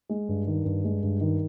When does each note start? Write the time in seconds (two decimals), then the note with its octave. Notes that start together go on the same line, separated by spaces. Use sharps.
0.09 G#3
0.29 G2
0.47 D#3
0.65 G2
0.84 G#3
1.03 G2
1.21 D#3